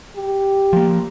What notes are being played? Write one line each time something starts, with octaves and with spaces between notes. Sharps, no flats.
G4
F3 A#3